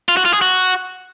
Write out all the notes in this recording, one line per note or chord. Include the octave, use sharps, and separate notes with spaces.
F4
F#4
F4
G#4
F#4